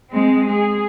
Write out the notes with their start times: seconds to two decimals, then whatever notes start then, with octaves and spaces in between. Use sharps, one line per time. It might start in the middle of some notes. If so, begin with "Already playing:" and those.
0.11 G#3 C4
0.46 G#4